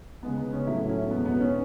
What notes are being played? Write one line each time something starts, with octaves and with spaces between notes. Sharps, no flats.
C#3 G#3 B3
B3
C#4
A2 F#3 A3 E4
C#4
E2 B2 G#3 B3
B3
C#4